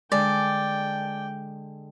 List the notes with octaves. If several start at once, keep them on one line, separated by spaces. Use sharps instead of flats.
D3 G#3 D5 G5